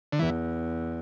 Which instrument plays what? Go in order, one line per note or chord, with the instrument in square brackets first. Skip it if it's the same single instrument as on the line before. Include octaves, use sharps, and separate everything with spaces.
[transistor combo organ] D3
[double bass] E2 [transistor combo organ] E3